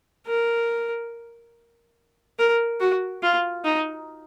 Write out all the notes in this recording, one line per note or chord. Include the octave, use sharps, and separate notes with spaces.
A#4
A#4
F#4
F4
D#4